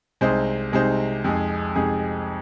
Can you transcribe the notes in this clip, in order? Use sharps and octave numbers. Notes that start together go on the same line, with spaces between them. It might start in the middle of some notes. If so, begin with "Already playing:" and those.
C2 C3 G#3 D#4 C5
C2 C3 G#3 D#4 C5
F2 C3 G#3 D#4 G#4
F2 C3 G#3 D#4 G#4